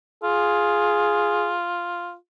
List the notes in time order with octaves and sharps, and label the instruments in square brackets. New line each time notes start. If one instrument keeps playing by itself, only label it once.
[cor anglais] F4 [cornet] G#4